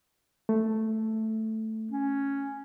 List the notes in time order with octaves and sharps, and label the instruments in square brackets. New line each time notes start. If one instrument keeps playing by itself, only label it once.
[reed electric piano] A3
[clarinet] C#4